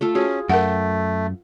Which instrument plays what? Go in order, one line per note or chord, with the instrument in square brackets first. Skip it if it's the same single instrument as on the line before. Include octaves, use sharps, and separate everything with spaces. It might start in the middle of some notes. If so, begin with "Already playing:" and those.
[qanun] A3 F4 A4
[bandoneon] C#4 [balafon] F#4 [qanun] G#4
[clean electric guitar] F#2 [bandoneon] A3 [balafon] A#4 F#5 [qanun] G5